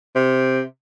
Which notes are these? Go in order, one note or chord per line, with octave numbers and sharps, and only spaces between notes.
C3